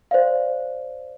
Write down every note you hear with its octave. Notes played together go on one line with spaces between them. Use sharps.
C5 D5 F5